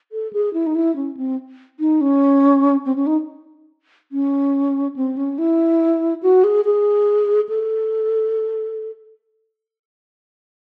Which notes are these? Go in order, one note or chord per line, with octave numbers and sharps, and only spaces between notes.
A4
G#4
E4
D#4
E4
C#4
C4
D#4
C#4
C4
C#4
D#4
C#4
C4
C#4
E4
F#4
G#4
G#4
A4